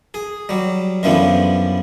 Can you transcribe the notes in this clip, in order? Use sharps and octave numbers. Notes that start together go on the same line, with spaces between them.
G#4
F#3 G3
F#2 D3 E3 F3 G3 B3